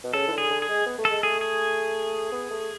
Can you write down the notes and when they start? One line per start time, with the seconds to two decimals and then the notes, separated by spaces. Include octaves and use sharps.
0.04 B2
0.14 C#3 A4
0.28 E3
0.32 D3
0.38 G#4
0.50 D3
0.62 G#4
0.69 G#3
0.86 B3
0.99 A3
1.05 A4
1.10 G#3
1.23 A3 G#4
1.41 G#4
2.32 B3
2.50 A3